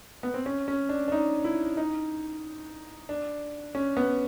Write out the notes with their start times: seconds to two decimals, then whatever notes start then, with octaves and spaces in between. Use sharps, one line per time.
0.23 B3
0.34 C4
0.46 C#4
0.68 C#4
0.89 D4
1.08 D4
1.12 D#4
1.44 E4
1.77 D#4
3.09 D4
3.75 C#4
3.97 B3